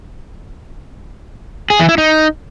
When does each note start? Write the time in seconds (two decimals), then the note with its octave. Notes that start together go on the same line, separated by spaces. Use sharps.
1.70 G#4
1.79 E3
1.89 E4
1.98 D#4